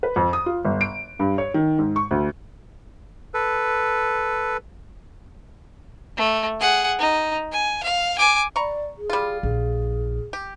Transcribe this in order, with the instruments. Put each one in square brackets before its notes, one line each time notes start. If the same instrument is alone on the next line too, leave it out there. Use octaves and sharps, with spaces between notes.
[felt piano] B4
F2
D#6
F4
G1
D7
G2
C#5
D#3
G#2
C#6
D2
[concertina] A4 B4
[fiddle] A3
G#4 F#5
D#4
G#5
F5
G#5 D6
[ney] D5 [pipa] A#5 C#6
[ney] G#4
[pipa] G3 F4
[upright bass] A#1 [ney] G#4
[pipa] G4